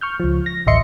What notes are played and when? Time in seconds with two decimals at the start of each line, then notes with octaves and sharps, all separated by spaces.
0.01 C#6 F6 G6
0.20 C#2 F3
0.46 A#6
0.67 A1 D2 D#5 E5 C6 C#7